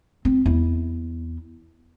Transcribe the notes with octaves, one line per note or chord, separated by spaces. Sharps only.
C4
E2 E4